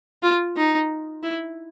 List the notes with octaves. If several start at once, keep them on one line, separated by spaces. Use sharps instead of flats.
F4
D#4
E4